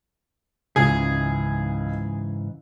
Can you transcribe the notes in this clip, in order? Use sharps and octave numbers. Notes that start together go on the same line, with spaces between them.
C#2 G#2 C#3 E3 G#4